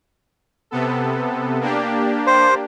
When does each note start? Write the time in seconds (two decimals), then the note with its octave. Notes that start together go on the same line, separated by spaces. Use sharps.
0.71 C3 B3 A4
1.61 A#3 D4 G4
2.27 C5